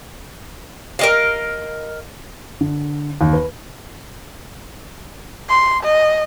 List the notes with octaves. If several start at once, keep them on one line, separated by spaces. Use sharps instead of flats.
A#4 D#5 F5
D3
D#2
B4
C6
D#5